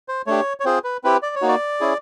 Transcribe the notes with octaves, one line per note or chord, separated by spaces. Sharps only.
C5
A3 D4 G4 C#5
C#5
C4 F4 G#4 C5
B4
C4 E4 G4 B4
D5
C#5
A#3 D#4 F#4
D5
C#4 E4 G#4